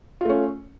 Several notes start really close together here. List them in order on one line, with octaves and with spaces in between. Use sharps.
F4 A3 C#4